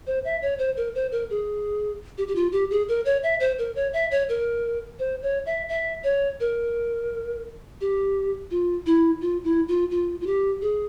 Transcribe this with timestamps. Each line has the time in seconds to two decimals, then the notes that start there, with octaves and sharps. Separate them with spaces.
0.07 C5
0.25 E5
0.42 C#5
0.59 C5
0.77 A#4
0.95 C5
1.12 A#4
1.30 G#4
2.18 G4
2.28 G4
2.35 F4
2.52 G4
2.71 G#4
2.88 A#4
3.05 C#5
3.23 E5
3.40 C5
3.59 A#4
3.76 C#5
3.93 E5
4.11 C#5
4.29 A#4
4.99 C5
5.23 C#5
5.46 E5
5.69 E5
6.04 C#5
6.40 A#4
7.81 G4
8.51 F4
8.86 E4
9.21 F4
9.44 E4
9.68 F4
9.91 F4
10.21 F4
10.26 G4
10.62 G#4